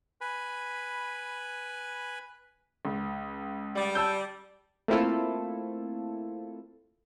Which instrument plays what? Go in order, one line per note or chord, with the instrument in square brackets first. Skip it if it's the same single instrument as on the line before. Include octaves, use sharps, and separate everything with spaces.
[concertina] B4 G#5 B5
[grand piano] C#2
[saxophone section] G3 D5
[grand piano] A5 E6 G6
[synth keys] A3 A#3 C4 E4 F4 A4